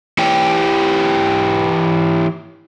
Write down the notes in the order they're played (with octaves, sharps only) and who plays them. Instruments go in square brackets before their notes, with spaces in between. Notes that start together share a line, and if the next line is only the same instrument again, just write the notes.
[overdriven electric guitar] E3 G4